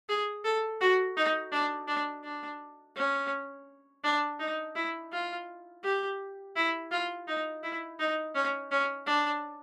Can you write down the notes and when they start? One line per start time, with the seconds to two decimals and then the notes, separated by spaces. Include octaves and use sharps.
0.09 G#4
0.44 A4
0.81 F#4
1.17 D#4
1.52 D4
1.88 D4
2.24 D4
2.96 C#4
4.04 D4
4.40 D#4
4.76 E4
5.12 F4
5.83 G4
6.56 E4
6.91 F4
7.28 D#4
7.63 E4
7.99 D#4
8.35 C#4
8.71 C#4
9.06 D4